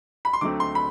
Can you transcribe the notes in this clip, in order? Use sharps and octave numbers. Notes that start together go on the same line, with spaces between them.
B5
C6
D2 D3 F#3 A3 C4 D6
C6
B5